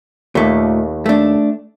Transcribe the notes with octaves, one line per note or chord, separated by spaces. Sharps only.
D#2 A#2 A3
A3 D4